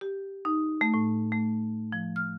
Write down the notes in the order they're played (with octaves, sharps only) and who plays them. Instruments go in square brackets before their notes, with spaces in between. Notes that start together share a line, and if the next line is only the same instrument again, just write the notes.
[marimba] G4
D#4
A3
A2
A3
F3
F6